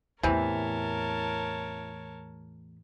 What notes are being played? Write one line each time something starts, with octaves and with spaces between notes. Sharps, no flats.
E2 A2 C3 E3 A#4 C#5 A5